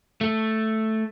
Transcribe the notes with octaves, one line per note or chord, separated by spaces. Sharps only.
A3